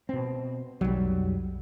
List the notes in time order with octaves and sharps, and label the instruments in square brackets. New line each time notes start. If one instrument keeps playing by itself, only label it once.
[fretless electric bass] B2 C4
[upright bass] B1 F2 [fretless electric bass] F#3 G3